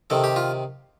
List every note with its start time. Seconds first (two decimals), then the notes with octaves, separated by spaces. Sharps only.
0.10 C3 D#3 A4
0.24 G4
0.36 F4